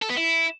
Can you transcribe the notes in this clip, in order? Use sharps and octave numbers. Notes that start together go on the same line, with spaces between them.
A4
B3
E4